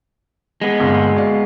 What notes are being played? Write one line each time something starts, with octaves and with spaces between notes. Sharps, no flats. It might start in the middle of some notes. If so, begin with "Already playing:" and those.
G#3 B3
G1 A#2
F#4 D5 F5